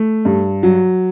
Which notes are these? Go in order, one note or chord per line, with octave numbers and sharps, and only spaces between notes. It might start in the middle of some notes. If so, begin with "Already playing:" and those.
Already playing: A3
G2
F#3